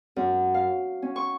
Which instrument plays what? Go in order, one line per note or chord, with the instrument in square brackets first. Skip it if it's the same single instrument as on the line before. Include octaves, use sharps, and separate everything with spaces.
[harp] F#2
F5
C#4
C#6